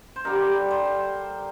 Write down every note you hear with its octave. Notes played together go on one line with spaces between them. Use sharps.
C5
G2 D3 G3 A#4
C5